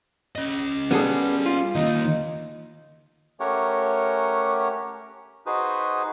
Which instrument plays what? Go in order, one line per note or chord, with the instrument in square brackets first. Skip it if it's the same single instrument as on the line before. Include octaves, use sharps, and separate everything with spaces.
[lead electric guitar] C#4 D#5
[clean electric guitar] G3 [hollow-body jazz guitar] B3 G#4 A4
[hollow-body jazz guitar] F4
[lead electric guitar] D#3 A#3 [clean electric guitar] D#4
[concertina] A3 C#4 G4 A#4 C#5 F#5
D#4 F#4 G#4 B4 C5